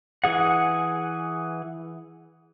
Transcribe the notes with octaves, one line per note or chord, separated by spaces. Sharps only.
E3 G#4 F#5